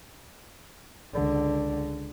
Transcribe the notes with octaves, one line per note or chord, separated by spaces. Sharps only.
C#2 D3